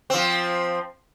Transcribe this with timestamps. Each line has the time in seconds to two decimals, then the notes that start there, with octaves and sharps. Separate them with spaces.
0.10 F3 C4